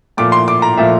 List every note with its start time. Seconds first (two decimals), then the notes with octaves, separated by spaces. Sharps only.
0.17 A#2 F3 A3 D6
0.32 C6
0.48 D6
0.62 A#5
0.77 A#2 F3 A3 E5